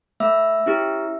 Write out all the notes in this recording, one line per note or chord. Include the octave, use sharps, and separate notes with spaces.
A3 E5 E6
C#4 E4 G4